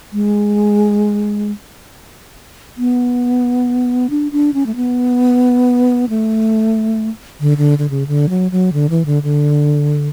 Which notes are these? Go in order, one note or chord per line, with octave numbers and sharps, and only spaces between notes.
G#3
B3
D4
D4
C#4
A3
B3
A3
D3
D3
D3
C#3
D3
F#3
F#3
D3
E3
D3
D3